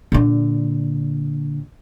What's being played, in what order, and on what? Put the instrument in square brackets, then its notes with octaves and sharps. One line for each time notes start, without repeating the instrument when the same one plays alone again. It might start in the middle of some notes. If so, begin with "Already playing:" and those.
[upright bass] A#2 D3